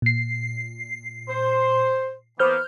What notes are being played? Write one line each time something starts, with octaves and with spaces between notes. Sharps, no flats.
A#2 C7
C5
E3 A#3 B3 C5 F6 G6